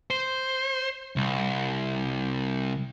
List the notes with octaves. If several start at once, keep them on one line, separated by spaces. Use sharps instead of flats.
C5
C2